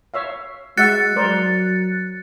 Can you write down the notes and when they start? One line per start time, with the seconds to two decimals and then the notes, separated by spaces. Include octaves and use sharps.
0.14 C#5 E5 F5
0.77 G#3 F#4 E5 F#6 A6 C#7
1.16 F#3 A#4 C5 D5